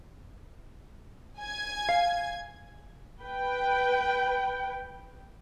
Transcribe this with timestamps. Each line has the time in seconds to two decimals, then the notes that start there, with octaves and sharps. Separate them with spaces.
1.40 G#5 G#6
1.89 F5
3.22 B4 G5